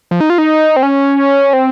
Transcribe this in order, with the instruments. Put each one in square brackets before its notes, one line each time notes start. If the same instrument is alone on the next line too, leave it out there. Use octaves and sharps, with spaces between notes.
[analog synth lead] F3
D#4
F4
D#4
C4
C#4
C4